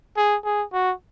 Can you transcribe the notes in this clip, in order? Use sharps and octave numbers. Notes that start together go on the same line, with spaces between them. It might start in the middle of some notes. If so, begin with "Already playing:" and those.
G#4
G#4
F#4